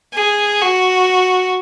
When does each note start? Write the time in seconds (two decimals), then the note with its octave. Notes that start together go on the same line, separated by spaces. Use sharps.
0.14 G#4
0.61 F#4